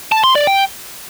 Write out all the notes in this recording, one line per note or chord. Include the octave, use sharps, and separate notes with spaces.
A5
C6
D5
G5